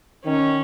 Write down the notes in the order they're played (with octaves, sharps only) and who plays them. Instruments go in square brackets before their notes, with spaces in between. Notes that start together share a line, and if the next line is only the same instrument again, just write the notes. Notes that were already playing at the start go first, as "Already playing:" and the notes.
[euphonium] D#3 [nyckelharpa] C#4